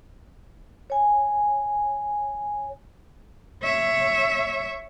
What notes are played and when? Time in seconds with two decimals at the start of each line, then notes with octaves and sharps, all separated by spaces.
0.90 C#5 G#5
3.63 C#5 E5